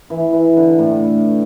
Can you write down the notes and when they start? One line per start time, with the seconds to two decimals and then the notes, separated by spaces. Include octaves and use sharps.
0.10 E3
0.33 E3
0.57 D3
0.79 A2